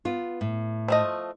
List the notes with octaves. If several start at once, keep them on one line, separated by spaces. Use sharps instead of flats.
B3 F4
A2
F3 A3 D#5